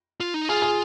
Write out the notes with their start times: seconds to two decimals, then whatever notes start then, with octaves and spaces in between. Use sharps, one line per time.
0.20 F4
0.34 D#4
0.49 F4 G#4
0.62 G#4